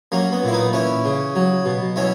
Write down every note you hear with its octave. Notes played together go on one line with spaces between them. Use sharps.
F#3 A#3 C#4
B3
A#2 E4
B3 D#4
E3 C#4 E4
C#3
F#3
B2
F#3 C#4 E4